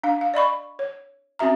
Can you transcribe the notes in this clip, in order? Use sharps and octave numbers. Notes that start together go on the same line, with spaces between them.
D4 F5
F5
D5 D#5 B5 C#6
C#5
C4 C#4 F#4 E5 A#5